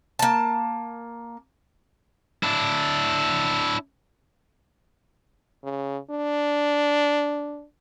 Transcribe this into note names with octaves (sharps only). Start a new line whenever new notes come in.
A#3 A5
D4 E4
C#3
D4